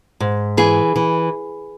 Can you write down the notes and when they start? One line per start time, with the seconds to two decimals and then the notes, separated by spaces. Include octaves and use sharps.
0.20 G#2
0.57 E3 G#4
0.96 E3